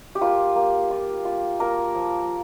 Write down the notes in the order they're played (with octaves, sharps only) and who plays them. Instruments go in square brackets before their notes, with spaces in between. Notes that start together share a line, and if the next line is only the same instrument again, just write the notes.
[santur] G4
A#3 F4
A#3
F4
F4
A#3 A#4
F3